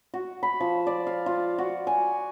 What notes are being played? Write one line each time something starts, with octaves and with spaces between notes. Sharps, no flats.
F#4
B5
F3
D5
F5
F4
F#4
G#5